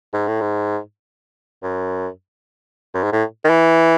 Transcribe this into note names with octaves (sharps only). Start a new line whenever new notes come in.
G#2
A2
G#2
F#2
F#2
G#2
A2
D#3
E3